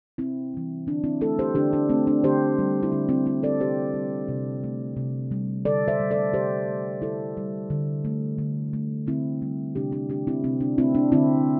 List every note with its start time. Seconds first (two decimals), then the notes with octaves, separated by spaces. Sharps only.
0.18 C3 C4 E4
0.54 E3 G3
0.87 D3 D4
1.04 C4 E4
1.21 A3 E4 A4
1.39 G4 C5
1.55 D3 D4 G4
1.73 D4
1.89 A3 C4
2.07 D4
2.23 D3 G4 C5
2.59 G3
2.83 E4
2.92 D3 D4
3.09 C4 E4
3.26 A3 C4 E4
3.43 A4 D5
3.60 C3 G4 C5
3.94 G3
4.28 C3
4.64 A3
4.97 C3
5.31 G3
5.65 D3 A4 D5
5.88 C5 E5
6.00 G3
6.11 A4 D5
6.34 C3 G4 C5
6.68 A3
7.02 D3 E4 A4
7.37 G3
7.70 D3
8.05 A3
8.38 D3
8.73 A3
9.07 D3 C4 E4
9.42 G3
9.75 C3 D4 G4
9.92 D4 G4
10.09 A3 D4 G4
10.27 C4 E4
10.44 C3 C4
10.61 D4
10.78 A3 C4 E4
10.95 D4
11.12 D3 C4 E4